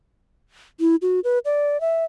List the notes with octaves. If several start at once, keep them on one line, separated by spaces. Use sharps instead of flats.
E4
F#4
B4
D5
E5